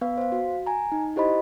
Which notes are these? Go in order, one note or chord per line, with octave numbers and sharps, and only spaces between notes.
B3 B4 F5
C5 F5
F#4
G#5 A#5
D#4
E4 G4 C5 D#5 B5